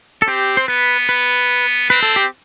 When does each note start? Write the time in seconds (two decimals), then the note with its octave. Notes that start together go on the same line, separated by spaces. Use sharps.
0.22 A4
0.27 C4 G4
0.57 C5
0.68 B3 B4
1.09 B4
1.90 C4 B4
2.03 A4
2.16 G4